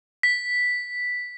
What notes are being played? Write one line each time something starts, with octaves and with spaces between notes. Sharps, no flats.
B6